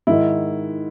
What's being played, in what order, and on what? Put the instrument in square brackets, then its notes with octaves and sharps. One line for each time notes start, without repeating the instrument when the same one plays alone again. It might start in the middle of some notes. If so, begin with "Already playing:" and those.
[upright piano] G#2 D#3 E4